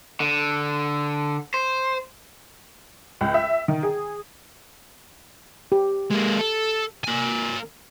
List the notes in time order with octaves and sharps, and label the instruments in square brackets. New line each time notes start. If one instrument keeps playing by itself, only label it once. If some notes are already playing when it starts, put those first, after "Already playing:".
[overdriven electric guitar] D3
C5
[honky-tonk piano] C#2
E5
D#3
G#4
[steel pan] G4
[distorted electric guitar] G#3 A#3
A4
A#3 G#5